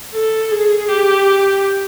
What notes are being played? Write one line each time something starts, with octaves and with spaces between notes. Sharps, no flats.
A4
G#4
G4